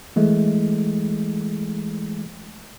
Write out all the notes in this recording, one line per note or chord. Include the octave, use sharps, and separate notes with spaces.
E3 G#3 A3